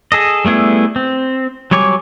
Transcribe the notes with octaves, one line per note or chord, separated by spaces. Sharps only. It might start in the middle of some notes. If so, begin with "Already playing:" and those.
G#4 A4 D#5
G3 A3 B3 E4 G#4
C4
F#3 G3 C#5 G#5 D6